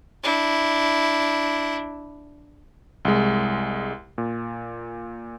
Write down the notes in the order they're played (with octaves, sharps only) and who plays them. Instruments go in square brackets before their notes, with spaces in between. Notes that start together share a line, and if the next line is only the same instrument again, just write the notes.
[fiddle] D4 E4
[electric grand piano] C2 G#3
A#2